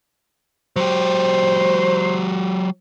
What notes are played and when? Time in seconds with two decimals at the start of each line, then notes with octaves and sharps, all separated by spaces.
0.76 F#3 G4 C5